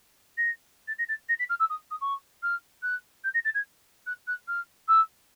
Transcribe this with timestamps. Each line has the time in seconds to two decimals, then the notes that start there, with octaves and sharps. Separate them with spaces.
0.37 A#6
0.87 A6
0.98 A#6
1.08 A6
1.29 A#6
1.39 B6
1.49 F6
1.59 E6
1.69 D#6
1.91 D#6
2.01 C#6
2.42 F6
2.82 F#6
3.24 G6
3.34 A#6
3.44 A6
3.54 G#6
4.06 F#6
4.27 F#6
4.47 F6
4.88 E6